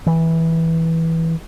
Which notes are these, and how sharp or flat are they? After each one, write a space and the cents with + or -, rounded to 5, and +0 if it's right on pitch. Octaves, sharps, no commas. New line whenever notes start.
E3 -10